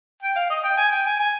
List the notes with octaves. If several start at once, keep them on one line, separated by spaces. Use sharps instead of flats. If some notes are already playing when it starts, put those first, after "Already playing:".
G5
F5
D#5
G5
G#5
G5
G#5
G#5